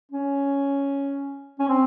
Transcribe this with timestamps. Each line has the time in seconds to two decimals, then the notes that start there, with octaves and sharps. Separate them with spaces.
0.12 C#4
1.60 C#4
1.68 C4